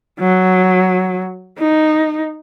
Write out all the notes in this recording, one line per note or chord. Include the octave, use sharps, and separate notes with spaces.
F#3
D#4